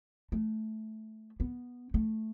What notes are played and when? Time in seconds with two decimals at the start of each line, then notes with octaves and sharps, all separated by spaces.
0.32 A3
1.40 B3
1.94 A3